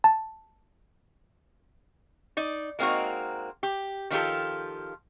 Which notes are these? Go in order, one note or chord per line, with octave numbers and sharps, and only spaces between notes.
A5
D#4 D5
G#3 A#3 C4 D#4 F#4 A#4
G4
D#3 F3 D4 F4 G4 A4